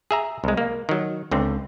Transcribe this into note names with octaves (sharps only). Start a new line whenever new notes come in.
G#4 E5 A#5
C2 G#3
A#3
D#3 F#3
C#2 D3 C4